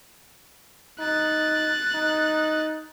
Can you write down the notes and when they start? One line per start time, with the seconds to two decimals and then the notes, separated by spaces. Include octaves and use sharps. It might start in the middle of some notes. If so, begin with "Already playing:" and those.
1.00 D#4 F#6 A6
1.95 D#4